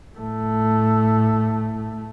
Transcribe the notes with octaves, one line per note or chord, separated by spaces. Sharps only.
A2 A3